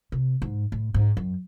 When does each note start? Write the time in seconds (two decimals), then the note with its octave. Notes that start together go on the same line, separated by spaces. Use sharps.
0.12 C3
0.42 G#2
0.72 A2
0.94 G#2
1.17 F#2